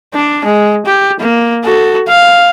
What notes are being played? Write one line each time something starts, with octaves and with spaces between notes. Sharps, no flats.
D4
G#3
G4
A#3
F#4 A4
F5